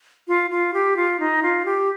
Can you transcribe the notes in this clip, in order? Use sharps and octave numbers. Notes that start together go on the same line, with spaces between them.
F4
F4
G4
F4
D#4
F4
G4